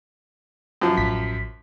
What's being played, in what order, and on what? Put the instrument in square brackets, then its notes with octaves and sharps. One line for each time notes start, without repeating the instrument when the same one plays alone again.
[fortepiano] F#2 F3
[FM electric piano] A1 B6